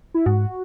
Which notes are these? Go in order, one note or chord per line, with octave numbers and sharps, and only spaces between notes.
E4
G#2 F#4